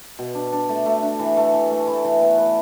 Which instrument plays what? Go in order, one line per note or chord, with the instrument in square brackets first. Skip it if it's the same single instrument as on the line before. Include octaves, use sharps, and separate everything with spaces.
[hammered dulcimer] B2
D4
D4
A3
A3
D4
E3
A3
E3
A3
E4
E3
B3
B4